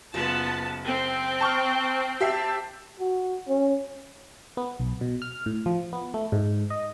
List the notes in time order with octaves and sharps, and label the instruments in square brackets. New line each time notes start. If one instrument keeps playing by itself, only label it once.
[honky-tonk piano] F#1 [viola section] B3 A5 [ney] F4
[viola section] C4 [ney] G5
[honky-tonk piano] A5 C#6 F6
[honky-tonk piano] G4 E5 C7 [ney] A5
[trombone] F#4
C#4
[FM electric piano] B3
B1
B2
F6
A2
F3
B3
A3
G#2
D#5